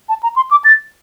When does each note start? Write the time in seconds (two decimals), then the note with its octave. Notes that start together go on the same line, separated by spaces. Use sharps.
0.09 A5
0.23 A#5
0.36 C6
0.51 D6
0.64 A6